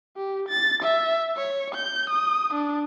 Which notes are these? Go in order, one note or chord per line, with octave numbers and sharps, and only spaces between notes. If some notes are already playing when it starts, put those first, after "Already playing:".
G4
A6
E5
C#5
G6
D#6
D4